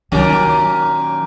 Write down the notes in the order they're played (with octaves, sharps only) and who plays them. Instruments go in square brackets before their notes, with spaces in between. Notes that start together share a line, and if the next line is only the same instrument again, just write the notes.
[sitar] A#2 C#4 G4 [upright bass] D#3 F#3